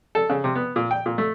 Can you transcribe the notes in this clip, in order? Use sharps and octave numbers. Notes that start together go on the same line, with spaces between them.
A4
C#3
C3
B3
A#2
G5
A#2
A3